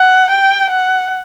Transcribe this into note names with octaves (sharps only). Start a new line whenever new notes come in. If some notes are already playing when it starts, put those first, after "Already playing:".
Already playing: F#5
G5
F#5